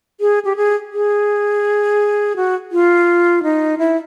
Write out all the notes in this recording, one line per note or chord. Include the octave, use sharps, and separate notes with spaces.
G#4
G4
G#4
G#4
F#4
F4
D#4
E4